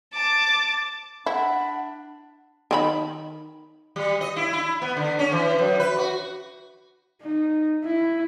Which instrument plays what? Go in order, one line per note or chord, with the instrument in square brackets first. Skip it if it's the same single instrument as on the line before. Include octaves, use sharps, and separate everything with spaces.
[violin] A5 D6
[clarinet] D4 [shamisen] E4 [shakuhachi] F#5 [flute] B5
[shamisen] D#3 E4 B5
[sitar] G3
D#5
E4
E4
B3
D3
C#4
E3
F#2
B4
F#4
[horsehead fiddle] D#4
E4